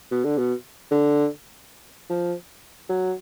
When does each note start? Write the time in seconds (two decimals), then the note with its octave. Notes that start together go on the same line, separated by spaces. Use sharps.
0.11 B2
0.24 D3
0.38 B2
0.91 D3
2.10 F3
2.89 F#3